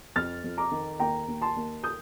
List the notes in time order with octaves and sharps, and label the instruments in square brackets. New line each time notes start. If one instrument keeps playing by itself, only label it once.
[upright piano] F2 F6 A6
F2
A#5 D6
D#3
D#2 G5 A#5
D#2
A5 C6
D#2
D#6 G6